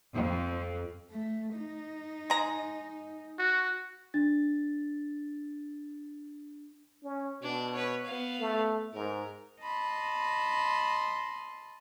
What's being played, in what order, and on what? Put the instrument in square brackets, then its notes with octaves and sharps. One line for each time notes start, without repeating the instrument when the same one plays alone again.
[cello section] F2
[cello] A3
D#4
[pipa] G#3 A#5
[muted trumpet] F#4
[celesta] D4 A6
[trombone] C#4
[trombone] B2 [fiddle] D4
[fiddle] B4 C#5
B3 F5
[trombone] A3
[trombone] G#2 [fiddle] A#4
[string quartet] D#5 A5 B5 C6